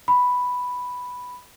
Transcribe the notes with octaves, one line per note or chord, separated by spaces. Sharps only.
B5